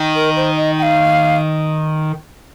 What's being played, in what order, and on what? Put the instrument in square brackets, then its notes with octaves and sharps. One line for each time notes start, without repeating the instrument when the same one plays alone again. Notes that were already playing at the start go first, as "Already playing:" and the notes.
Already playing: [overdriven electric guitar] D#3
[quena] A#4
C5
D#5
G5
F5